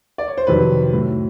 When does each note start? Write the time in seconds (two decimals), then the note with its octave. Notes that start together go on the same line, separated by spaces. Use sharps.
0.18 D5
0.28 C#5
0.38 C5
0.47 F2 C3 D#3 F#3 B4
0.93 A2 F#3